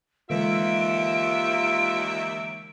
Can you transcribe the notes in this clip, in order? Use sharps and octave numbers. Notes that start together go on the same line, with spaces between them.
D#2 D3 E3 G#3 F4 E5 D7